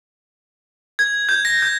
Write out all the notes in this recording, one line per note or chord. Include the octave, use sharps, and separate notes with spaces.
G#6
G6
A#6
G6